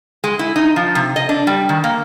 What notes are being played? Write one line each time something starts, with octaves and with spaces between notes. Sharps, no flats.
G#3
E4
D#4
F3
C3
D#5
D4
G3
D#3
A#3